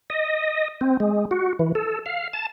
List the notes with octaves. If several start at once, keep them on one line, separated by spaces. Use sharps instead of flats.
D#5
C4
G#3
F#4
E3
A4
F5
A5